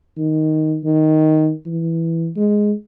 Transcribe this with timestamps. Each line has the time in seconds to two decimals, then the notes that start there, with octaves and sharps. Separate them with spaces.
0.17 D#3
0.84 D#3
1.66 E3
2.36 G#3